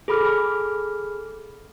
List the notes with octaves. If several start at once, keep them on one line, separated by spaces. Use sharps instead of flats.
G#4 A4 B5 D6 F6